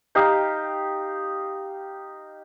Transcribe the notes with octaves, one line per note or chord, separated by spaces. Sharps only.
D#4 G4 F5